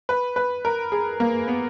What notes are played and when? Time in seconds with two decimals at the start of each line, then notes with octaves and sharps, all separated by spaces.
0.09 B4
0.36 B4
0.65 A#4
0.92 G#4
1.20 A#3
1.48 B3